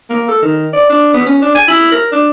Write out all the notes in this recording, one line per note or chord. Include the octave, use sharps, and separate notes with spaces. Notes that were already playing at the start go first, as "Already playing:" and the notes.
A#3
A4
D#3
D5
D4
B3
C#4
D4
G#5
E4
A#4
D4